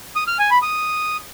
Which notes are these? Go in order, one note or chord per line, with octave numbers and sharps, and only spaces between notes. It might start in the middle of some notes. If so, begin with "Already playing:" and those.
D#6
F6
G#5
B5
D#6